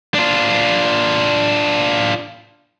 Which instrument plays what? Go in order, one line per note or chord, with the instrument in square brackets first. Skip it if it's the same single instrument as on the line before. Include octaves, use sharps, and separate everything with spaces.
[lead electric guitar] D4 F4